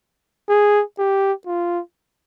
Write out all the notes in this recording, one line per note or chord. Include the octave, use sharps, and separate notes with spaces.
G#4
G4
F4